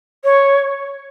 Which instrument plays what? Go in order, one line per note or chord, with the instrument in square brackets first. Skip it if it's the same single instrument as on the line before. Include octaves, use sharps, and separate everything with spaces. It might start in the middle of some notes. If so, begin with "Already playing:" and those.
[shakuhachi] C#5